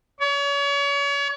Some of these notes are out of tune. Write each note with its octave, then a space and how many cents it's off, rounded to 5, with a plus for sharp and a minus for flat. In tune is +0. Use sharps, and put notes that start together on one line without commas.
C#5 +35